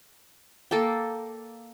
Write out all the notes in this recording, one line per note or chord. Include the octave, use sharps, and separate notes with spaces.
A#3 A4 D5 G5